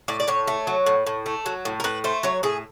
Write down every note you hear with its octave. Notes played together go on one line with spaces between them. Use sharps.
A2 D5
D5
A2 C#5
A3
F#3
A2
A2
A3
F#3
A2
A#4
A2 B4
A3 C5
F#3 C#5
A2 G#4